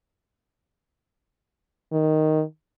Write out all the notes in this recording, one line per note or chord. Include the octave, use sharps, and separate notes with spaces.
D#3